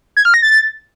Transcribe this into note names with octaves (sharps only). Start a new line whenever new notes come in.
G#6
F6
A#6
A6